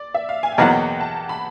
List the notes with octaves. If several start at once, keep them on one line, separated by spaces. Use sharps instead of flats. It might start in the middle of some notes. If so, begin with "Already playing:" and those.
Already playing: D5
E5
F5
G#5
G5
E2 B2 F#3 A#3 F#5
G5
A5
B5